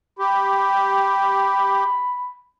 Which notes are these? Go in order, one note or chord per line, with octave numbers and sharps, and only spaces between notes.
G4 B5